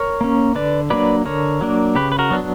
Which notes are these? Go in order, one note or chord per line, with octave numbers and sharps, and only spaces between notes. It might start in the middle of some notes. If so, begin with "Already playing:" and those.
Already playing: A#4 C#5
A#3 C#4
D3 B4 D5
F#3 A#3 D4 B4 D5
D3 A#4 C#5
F#3 A#3 D4
C#3 G4 B4
B4
F#4 A#4
F#3 B3 D4